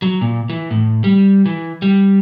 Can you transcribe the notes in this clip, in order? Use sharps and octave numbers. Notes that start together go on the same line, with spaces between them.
F#3
A#2
E3
A2
G3
E3
G3